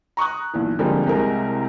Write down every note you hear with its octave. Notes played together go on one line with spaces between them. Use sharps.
A#5 C#6 D#6 F#6
B1 A#2 E3
D3 F3 G3 G#3 A#3 C4
C2 C3 G#3 C4 A#4